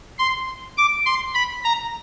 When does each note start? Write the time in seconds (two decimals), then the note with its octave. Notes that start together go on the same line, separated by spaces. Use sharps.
0.19 C6
0.77 D6
1.06 C6
1.34 B5
1.64 A#5